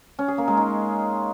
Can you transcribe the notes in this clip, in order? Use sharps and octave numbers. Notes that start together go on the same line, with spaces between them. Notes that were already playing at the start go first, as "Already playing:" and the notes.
C#4
G#4
A#3
G#3
D#4